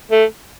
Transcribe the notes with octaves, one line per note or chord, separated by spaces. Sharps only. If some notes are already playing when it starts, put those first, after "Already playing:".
A3